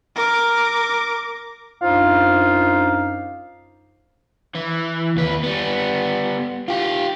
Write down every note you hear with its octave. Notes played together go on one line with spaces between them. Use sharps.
A#4 D6
F#2 D4 D#4 F4 C5 F5
E3
D#2 B4
G3 B3
F4 G4